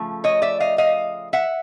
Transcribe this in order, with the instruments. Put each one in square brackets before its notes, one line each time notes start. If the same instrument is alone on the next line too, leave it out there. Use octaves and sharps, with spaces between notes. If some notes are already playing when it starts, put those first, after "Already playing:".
Already playing: [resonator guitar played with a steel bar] C#3 F3 A3
C#5 D#5
D5 E5
D#5 F5
D#5 F5
E5 F#5